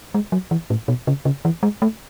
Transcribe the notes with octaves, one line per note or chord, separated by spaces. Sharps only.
G#3
F#3
E3
A2
B2
C#3
C#3
E3
G#3
A3